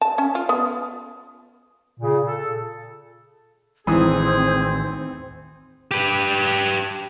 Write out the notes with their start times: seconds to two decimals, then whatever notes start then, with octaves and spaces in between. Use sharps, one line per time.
0.01 A5
0.18 C#4
0.35 F4
0.49 B3
1.99 A#2 C#3
2.26 A4
3.87 A1 D#3 E3 C4 G#4 D#6
5.91 G4 B4